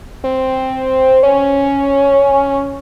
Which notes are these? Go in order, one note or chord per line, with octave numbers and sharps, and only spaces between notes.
C4
C#4